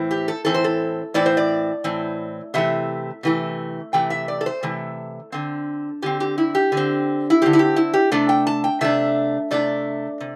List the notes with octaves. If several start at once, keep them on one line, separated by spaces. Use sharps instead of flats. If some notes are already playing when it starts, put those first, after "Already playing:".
Already playing: A2 E3 C4
G4
A4
A2 E3 C4 A4
C5
A4
A2 E3 C4 D5
C5
D5
A2 E3 C4
C3 E3 A3 E5
C3 E3 A3
C3 E3 A3 G5
E5
D5
A4
C5
C3 E3 A3 A4
D3 C4
D3 C4 G4
G4
E4
G4
D3
C4
E4
D3 C4 G4
E4
G4
E4
G4
C3 A3 D4 A4
G5
A5
G5
C3 A3 D4 E5
C3 A3 D4 D5
C3